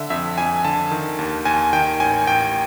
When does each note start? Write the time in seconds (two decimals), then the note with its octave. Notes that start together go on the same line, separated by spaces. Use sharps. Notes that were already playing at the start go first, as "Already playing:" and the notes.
Already playing: D3 E5
0.10 F2 E5
0.38 F2 G#5
0.65 D3 A5
0.91 D#3
1.19 D#2
1.45 D#2 G#5
1.73 D#3 G5
2.00 A1 G#5
2.27 A1 G5